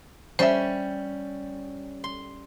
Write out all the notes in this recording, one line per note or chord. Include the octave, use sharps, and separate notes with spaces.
G3 C#4 C5 E5
C6